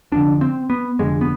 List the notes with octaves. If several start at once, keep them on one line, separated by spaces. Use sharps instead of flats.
F1 F2 D3 D4
C4
B3
F1 F2 D3 G#3
B3